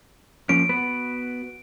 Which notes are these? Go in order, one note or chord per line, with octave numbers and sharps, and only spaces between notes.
F3 A#3 C#4 D7
B3 F#4 B4